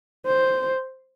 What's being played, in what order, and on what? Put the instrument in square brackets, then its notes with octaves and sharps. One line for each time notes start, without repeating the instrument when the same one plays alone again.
[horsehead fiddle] C5